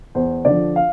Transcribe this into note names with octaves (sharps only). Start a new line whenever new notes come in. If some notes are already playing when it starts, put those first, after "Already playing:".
E2 C5
D3 F3 D5
F5